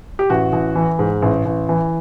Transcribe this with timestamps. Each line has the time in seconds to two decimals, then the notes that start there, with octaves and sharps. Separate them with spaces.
0.19 G4
0.30 A1 F#4
0.52 A1
0.75 E3
0.99 G#2
1.22 A1
1.45 A1
1.69 E3